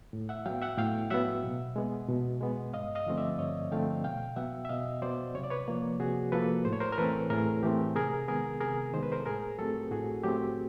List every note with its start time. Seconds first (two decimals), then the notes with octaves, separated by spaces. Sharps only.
0.13 A2
0.29 E5 F#5
0.46 F#3 B3 F5 G5
0.62 E5 F#5
0.78 A2 F5 G5
1.10 F#3 B3 E5 F#5
1.44 B2
1.76 G#3 B3
2.09 B2
2.41 G#3 B3
2.74 G2 D#5 F5
2.95 D#5 F5
3.06 D3 F3 A3 C4
3.17 D5 E5
3.39 G2 C#5 D#5
3.72 D3 F3 A3 C4 F5 G5
4.04 B2 F5 G5
4.36 F#3 B3 E5 F#5
4.65 E5
4.69 B2 D#5 F5
5.02 F#3 B3 C5 D5
5.35 C3 C#5
5.43 D5
5.50 B4 C#5
5.68 F3 A#3
6.00 C3 F#4 G#4
6.32 F3 A#3 A4 B4
6.65 A2 C5
6.73 C#5
6.80 A#4 C5
6.92 A#4
6.98 E3 A3 C4 A4 B4
7.30 A2 G#4 A#4
7.63 E3 A3 C4 G4
7.96 C3 G#4 A#4
8.28 D#3 G#3 B3 G#4 A#4
8.61 C3 G#4 A#4
8.93 D#3 G#3 B3 C5
9.03 B4
9.12 A#4 C5
9.20 A4
9.26 A2 G#4 A#4
9.58 F#3 A3 C4 G4 A4
9.91 A2 F#4 G#4
10.23 F#3 A3 C4 G4